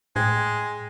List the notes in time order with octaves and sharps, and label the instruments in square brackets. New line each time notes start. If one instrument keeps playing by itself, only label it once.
[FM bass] A2 [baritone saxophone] G#3 [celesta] G5 G#6